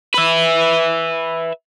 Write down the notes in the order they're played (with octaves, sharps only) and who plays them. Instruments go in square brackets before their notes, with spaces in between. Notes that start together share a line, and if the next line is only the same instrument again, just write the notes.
[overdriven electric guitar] B4 E5